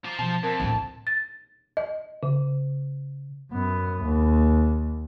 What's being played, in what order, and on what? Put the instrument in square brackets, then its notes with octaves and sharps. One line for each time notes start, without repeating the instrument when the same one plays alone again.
[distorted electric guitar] F4 C5 [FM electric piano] A#5 D6
[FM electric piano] B2 F3 [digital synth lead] A5
[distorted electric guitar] F2 [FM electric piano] A#4 G#6
[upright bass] D2 A2
[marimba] A6
D#5
C#3
[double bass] F#2 B3
D#2